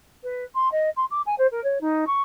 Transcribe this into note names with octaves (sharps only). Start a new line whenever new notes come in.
B4
C6
D#5
C6
D6
G#5
C5
A#4
C#5
D#4
C#6